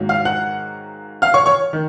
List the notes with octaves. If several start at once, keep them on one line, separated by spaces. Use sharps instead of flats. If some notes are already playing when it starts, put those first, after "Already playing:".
Already playing: G#2 D#3 F#3 A#3
F5 F6
F#5 F#6
F5 F6
C#5 C#6
C#5 C#6
D#3